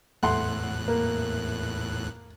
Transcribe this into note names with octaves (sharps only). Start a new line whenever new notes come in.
E2 A2 A3 F#5 C6 F#6
A#3